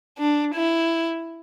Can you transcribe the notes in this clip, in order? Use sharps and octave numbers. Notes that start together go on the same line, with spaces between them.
D4
E4